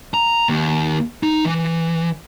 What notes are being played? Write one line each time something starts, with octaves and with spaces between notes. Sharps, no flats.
A#5
D#2
D#4
E3